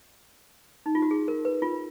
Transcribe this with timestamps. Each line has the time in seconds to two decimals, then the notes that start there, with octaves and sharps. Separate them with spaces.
0.86 D#4
0.95 F4
1.02 F#4
1.11 G#4
1.28 A#4
1.45 B4
1.62 F4